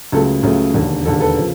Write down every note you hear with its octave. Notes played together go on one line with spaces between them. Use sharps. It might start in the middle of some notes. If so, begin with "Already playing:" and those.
C#2 C#3 F#3 A3 A4
C#2 C#3 F#3 A3
E1 D#2 D3
E1 D#2 D3 A4
A4 B4
C#3 F3